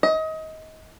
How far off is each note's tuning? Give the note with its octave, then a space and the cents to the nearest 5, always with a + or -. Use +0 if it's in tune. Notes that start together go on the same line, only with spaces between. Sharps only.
D#5 +25